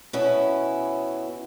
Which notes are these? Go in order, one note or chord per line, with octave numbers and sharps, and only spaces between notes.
B2 B3 C#4 E4